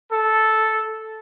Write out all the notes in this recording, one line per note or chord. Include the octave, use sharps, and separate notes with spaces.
A4